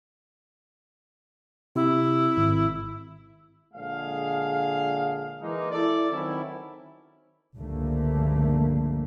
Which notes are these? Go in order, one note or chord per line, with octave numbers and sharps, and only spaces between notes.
C3 E4
G#1
A#1 D3 G#3 G#4 F5
E3 G#3 A#3 D#4
E4 A4 D5
D#3 F#3 C4 C#4 E4
C#2 G2 D3 F3 A3 A#3